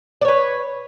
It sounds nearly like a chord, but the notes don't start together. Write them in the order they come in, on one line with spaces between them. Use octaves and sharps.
D5 C#5 B4